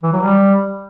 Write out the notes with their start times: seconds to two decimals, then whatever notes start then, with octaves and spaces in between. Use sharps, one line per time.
0.03 E3
0.13 F#3
0.23 G3